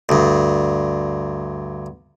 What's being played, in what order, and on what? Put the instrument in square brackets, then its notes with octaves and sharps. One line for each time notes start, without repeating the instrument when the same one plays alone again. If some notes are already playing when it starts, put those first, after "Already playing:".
[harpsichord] D2 G2